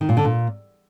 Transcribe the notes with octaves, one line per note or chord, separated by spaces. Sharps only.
D#3
A#2
D3
A#2